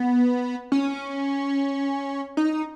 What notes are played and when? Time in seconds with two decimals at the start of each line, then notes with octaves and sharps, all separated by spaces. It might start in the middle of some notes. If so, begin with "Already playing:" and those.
Already playing: B3
0.72 C#4
2.37 D#4